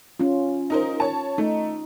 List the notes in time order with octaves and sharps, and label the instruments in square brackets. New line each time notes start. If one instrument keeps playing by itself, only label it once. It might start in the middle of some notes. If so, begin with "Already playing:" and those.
[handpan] C#4 F4
[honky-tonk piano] D#4 A#4 C5
C#5 A5
[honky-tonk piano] A3 [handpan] D#4